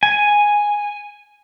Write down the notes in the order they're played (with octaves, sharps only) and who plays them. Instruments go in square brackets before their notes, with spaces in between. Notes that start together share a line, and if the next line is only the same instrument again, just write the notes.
[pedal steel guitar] G#5